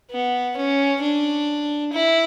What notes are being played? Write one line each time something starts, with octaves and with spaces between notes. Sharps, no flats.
B3
C#4
D4
E4